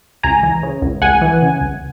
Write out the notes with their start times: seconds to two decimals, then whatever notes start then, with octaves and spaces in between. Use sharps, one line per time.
0.23 C#2 G#5 A#5
0.43 E3
0.63 C#3
0.82 C#2
1.02 C#2 F#5 G#5
1.21 E3
1.42 C#3
1.61 C#2